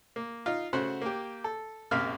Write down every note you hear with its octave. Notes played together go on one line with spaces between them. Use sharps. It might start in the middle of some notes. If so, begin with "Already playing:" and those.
A#3
D#4 F4
C#3 A3 F#4 C5 F#5
A#3 G4
A4
A#1 F#2 C3 A#3 F5 F6